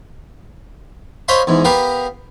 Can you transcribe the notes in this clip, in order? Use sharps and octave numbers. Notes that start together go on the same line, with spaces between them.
C5 C#5 D#5 F5 B5 C6
E2 G#2
B3 G4 A#4 F5